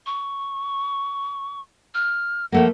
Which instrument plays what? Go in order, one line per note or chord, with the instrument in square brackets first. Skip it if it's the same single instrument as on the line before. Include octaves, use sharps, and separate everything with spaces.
[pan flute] C#6
F6
[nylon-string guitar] F3 A3 A#3 [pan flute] F#5